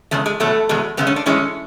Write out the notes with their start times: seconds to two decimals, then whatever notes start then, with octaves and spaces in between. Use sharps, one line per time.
0.11 E2 C#3 G#3 A3
0.26 G#3
0.40 E2 B2 F#3 A3
0.69 E2 B2 G#3
0.97 F#2 C#3 G#3 B3
1.07 C#4
1.16 D4
1.26 A2 E3 G#3 C#4